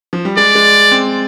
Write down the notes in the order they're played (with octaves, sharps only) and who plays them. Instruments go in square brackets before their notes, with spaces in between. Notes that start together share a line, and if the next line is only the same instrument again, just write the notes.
[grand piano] F3
G3
[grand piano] G#3 [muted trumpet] D5
[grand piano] G#3
C4